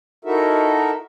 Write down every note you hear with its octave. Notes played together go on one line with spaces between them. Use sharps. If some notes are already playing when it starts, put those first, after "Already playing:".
D#4 E4 F#4 A4 A#4 E5